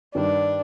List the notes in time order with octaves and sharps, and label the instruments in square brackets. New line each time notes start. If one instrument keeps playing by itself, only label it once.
[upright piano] G2 D#3 G3 [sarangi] D4